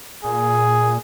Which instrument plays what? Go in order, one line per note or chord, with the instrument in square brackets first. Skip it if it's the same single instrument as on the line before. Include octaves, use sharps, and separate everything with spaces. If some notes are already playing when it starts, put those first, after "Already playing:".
[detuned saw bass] A#2 [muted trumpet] G#4